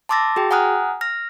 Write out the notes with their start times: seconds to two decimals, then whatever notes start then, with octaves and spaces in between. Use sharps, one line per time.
0.09 A5 C6 D6 E6 A6 A#6
0.36 F#4 G#4 G5
0.51 F#5 G#5 A#5 D#6 F6 F#6
1.01 F6 A#6